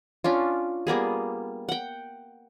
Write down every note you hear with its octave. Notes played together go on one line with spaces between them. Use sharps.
C#4 D4 F4
G3 A#3 B3 G#4
F#5 G5